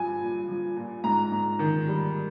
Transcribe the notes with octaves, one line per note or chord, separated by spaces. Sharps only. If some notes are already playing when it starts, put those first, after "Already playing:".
Already playing: G2 F3 G#5
A#2
F3
A#2
G#2 A#5
G#2
D#3
G3